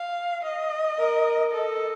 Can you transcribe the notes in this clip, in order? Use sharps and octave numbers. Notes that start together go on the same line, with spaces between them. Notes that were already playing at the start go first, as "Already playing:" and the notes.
Already playing: F5
D#5
A#4
A4 D#5